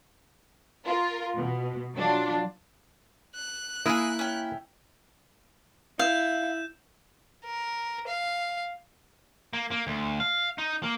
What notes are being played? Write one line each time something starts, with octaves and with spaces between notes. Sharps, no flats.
F4 A#4
B2
F#3 D4 F4
F#6
A#3 E4 G#4 A#4 D#6
C#4 G5
E4 F5 G6 E7
A#4
F5
A#3
A#3
D2
F5
D#4
A#3